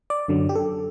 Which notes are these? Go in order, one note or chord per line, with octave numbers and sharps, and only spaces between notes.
D5
F#2 D3 F#3
G4
A4